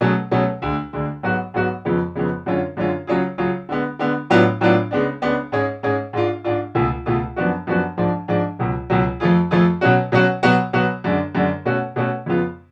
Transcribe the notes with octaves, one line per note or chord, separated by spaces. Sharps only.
B2 F#3 A3 C#4 G#4
B2 F#3 A3 C#4 G#4
D2 D3 G#3
D2 D3 G#3
G#2 F#3 B3 F#4
G#2 F#3 B3 F#4
F2 C#3 G#3 B3
F2 C#3 G#3 B3
F#2 D3 G#3 C#4 F4
F#2 D3 G#3 C#4 F4
C#3 F#3 C#4 F4 G#4
C#3 F#3 C#4 F4 G#4
D3 G#3 B3
D3 G#3 B3
A2 F#3 B3 D4 F4
A2 F#3 B3 D4 F4
C#3 G#3 B3 D4
C#3 G#3 B3 D4
G#2 G#3 C#4 G#4
G#2 G#3 C#4 G#4
G#2 G#3 D4 F4
G#2 G#3 D4 F4
C#2 B2 A3 F4 G#4
C#2 B2 A3 F4 G#4
F#2 F3 B3 D4 F#4
F#2 F3 B3 D4 F#4
G#2 F3 G#3 D4
G#2 F3 G#3 D4
C#2 B2 F#3
C#2 B2 F#3
F2 F3 A3 F4 G#4
F2 F3 A3 F4 G#4
B2 F#3 C#4 F#4
B2 F#3 C#4 F#4
B2 F#3 B3 F#4
B2 F#3 B3 F#4
F#2 D3 G#3 D4
F#2 D3 G#3 D4
B2 A3 C#4 F#4
B2 A3 C#4 F#4
F2 C#3 G#3 B3 F4